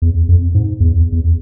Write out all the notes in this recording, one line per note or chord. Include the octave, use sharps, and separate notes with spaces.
E2
F2
G#2
E2
E2